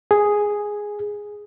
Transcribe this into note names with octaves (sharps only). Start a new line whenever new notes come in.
G#4